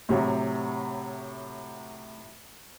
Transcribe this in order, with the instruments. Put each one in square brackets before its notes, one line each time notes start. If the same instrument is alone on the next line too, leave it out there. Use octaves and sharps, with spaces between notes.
[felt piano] A2 C3 F#3